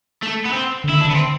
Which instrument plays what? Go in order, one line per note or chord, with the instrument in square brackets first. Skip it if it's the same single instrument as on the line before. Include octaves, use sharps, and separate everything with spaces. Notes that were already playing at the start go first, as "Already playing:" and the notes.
[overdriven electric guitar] A3
B3
C4
[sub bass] D3
[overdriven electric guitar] E4
D4
[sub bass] D3
[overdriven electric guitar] B3
C4